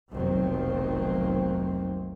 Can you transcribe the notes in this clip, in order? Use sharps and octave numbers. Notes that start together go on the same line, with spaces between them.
F1 B1 D#3 F#3 A#3 C4